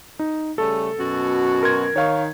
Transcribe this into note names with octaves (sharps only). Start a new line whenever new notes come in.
D#4
C#3 G3 A3 A4
F#2 B2 F#4
A#4 C6 G#6
D#3 C#5 F5 C#6